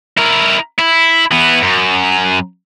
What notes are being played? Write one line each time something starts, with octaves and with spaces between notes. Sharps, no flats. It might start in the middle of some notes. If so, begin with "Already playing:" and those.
E4 A#4
E4
E3 B3
F#2